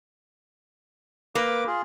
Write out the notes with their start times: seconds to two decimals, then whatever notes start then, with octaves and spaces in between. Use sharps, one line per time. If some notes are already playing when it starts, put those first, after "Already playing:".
1.35 A#3 B4 D6
1.67 F4 G#4